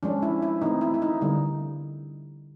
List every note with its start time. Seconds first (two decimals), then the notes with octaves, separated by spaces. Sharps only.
0.03 F3 G#3 C#4 D4
0.22 E4
0.42 E4
0.61 E3 A3 C4 D#4
0.81 E4
0.94 E4
1.02 D#4
1.21 D3 G3 B3 D#4